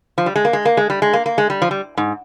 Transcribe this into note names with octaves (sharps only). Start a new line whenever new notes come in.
F3
G3
G#3
A#3
G#3
A#3
G#3
G3
G#3
A#3
A#3
G#3
G3
F3
G3
G#2